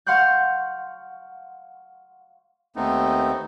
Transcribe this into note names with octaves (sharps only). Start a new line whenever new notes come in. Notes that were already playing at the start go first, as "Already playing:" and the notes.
F5 F#5 C6 C#6 F#6 G6
D#2 A3 B3 C4 D#4